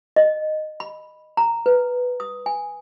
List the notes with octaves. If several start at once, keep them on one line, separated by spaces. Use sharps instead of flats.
D#5
B5
A#5
B4
D#6
G#5